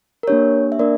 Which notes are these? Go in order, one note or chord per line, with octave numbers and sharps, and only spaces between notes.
A#4
A#3 D4 G4 C#5
E5
A#3 D4 A#4 D5